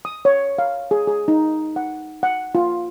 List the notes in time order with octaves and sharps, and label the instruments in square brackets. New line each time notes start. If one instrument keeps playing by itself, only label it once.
[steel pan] D#6
C#5
F5
G#4
G#4
D#4
F#5
F#5
F4